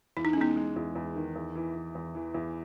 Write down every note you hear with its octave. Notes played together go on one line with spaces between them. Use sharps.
E2 E4
D#4
C#4
G#3 B3 D#4
G#3
E2
E2
D#3
E2
E3
E3
E2
E3
E2